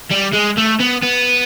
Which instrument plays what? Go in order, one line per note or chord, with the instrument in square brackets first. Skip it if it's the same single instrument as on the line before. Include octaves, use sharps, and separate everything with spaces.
[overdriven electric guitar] G3
G#3
A3
B3
B3